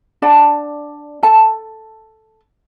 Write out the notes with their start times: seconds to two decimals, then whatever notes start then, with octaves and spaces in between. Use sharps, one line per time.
0.22 D4 D5 F#5 A5
1.23 A4 A5